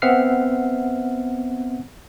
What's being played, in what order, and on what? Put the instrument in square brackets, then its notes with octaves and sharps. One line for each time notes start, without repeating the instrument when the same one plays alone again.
[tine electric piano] B3 C4 E5 F#5 F6 C7